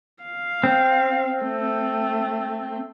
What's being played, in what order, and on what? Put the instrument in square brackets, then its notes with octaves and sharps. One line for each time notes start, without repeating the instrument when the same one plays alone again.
[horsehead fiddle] F5
[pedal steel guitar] C4
[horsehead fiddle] A3